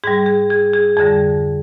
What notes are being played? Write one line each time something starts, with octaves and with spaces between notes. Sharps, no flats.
G#2 G3 G#4
G#4
G#4
G#4
F2 D3 G3 G#4